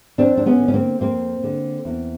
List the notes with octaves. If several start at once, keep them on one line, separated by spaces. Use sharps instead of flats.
F2 C4 D4
D4
B3 C#4
D3
C#4
A#3 C4
F2 A#3 C4
D3
E2